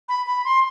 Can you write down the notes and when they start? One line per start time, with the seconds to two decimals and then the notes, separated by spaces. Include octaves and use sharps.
0.09 B5
0.26 B5
0.45 C6